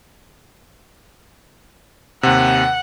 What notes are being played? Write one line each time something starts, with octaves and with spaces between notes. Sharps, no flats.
D#2 C3 F#5